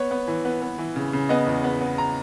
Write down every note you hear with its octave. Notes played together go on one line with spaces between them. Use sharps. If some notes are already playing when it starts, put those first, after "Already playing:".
Already playing: B3 C#5
B3
E3
B3
B3
E3
C#3
C#3
B3 D#5
E2
B3
B3
A#5